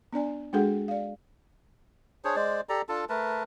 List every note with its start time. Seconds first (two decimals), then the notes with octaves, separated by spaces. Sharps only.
0.13 B3 D4 D5 G#5
0.53 G#3 D4 F#4 G#4 A4 F#5
0.88 D5 F5
2.25 D4 G#4 C5 C#5
2.36 G#3 C5 D5
2.69 G4 A4 D5 A#5
2.89 D4 F4 A4 A5
3.09 A3 A#4 B4 A5